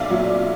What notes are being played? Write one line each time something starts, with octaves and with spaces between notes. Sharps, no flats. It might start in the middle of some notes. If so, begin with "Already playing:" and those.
Already playing: B1 D5 E5 F5
A#2 F#3